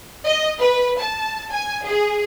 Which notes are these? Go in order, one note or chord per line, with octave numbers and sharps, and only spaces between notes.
D#5
B4
A5
G#5
G#4